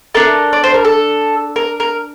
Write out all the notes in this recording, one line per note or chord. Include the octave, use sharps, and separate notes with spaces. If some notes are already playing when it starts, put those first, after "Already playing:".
D4 A4 A#4
D5
C5
A#4
A4
A#4
A#4